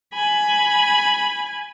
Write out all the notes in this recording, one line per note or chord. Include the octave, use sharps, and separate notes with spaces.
G#5 B5